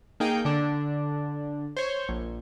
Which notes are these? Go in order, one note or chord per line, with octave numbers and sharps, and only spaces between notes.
A#3 D#4 G#4 G5
D3 D4
C5 C#5
A#1